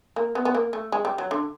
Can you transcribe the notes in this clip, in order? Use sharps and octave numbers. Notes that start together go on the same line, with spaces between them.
A#3
B3
B3
A#3
A3
G#3
G3
F#3
D3